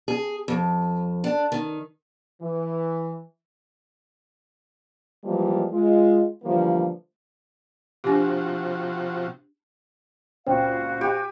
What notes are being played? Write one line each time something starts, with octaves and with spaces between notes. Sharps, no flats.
G#4
F2
D4
D#3
E3
E3 F3 G3 G#3 A#3
G#3 F4
D3 E3 F3 G3 A3 A#3
C3 F3 D4 F#4 G4
C#2 A#2 C#3 C4 F#4 C5 F5
G4 G#5 D7